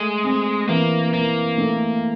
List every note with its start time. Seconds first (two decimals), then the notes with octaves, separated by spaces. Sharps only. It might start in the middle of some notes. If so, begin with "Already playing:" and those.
Already playing: G#3 A3
0.24 C4
0.68 E3 A#3
1.13 E3 A#3
1.58 A3